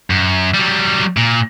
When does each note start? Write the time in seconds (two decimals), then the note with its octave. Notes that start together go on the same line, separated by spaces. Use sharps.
0.10 F#2
0.54 F#3 G3
1.17 A#2